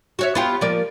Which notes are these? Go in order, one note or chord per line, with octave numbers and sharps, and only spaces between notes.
F#4 C#5 E5
B3 F4 G4
F3 A#3 D5